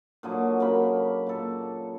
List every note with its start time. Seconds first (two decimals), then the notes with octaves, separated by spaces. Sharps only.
0.23 A#2 D3 F#3 D#5
0.60 C#3 A#3 A#4 B5
1.27 A#2 A4